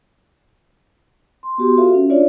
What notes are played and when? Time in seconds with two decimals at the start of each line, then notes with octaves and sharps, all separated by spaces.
1.43 C6
1.58 B3 F#4 G4 C6
1.77 F4 F#4 A4 C5 E5 F5
1.94 C#4
2.10 D4 F4 C#5 D5 E5